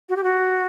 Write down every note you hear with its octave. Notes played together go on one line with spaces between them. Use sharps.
F#4
G4
F#4